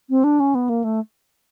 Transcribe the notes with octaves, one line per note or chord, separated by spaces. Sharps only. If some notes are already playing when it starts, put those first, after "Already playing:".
C4
D4
C#4
B3
A#3
A3